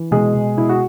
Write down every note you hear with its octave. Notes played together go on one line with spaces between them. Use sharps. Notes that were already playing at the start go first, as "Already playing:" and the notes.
Already playing: E3
B2 G#3 G#4
B2
B2 E4
F#4